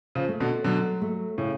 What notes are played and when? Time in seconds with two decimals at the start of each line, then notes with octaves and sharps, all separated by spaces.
0.15 C#3 F3
0.28 A3
0.40 B2 D3
0.64 B2 D3 F#3
1.02 A3
1.38 A2 C#3